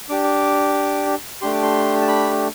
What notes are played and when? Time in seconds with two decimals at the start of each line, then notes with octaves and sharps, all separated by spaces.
0.09 D4 G4 D6
0.24 D6
1.41 A3 D4 G4 C6
1.53 D6
1.63 C6
2.02 A5
2.08 B5